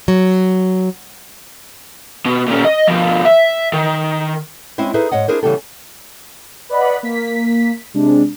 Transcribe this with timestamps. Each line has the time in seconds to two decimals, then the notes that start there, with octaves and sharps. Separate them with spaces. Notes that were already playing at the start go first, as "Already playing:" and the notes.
0.08 F#3
2.25 B2
2.48 A#2 C#4
2.65 D#5
2.88 B2 F3
3.25 E5
3.73 D#3
4.78 G#3 C4 C#4 E4 C5
4.94 D#4 G#4 A4 B4 C5 E5
5.11 G#2 C#5 D#5 F#5
5.28 D4 E4 G#4 A#4 C5
5.43 C#3 E3 G3 B3 G4 A4
6.69 B4 D5 D#5 F#5 B5
7.03 A#3 B6
7.94 C3 G#3 D4